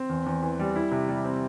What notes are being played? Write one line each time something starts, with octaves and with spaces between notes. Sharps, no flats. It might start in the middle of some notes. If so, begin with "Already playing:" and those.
Already playing: C4
E2
E2
E3
G3
E4
C3
G3
C4